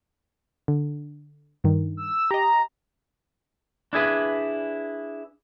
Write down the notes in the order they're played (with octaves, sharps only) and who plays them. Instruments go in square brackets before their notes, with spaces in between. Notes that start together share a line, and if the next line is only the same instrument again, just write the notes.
[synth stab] D3
G2 D#3
[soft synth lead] E6
[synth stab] G4 D#5 [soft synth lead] A#5
[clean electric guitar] D4 E4 G#4 B4